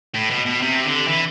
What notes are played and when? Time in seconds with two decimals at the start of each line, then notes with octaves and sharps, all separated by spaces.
0.14 A2
0.30 B2
0.46 B2
0.62 C3
0.85 D3
1.08 E3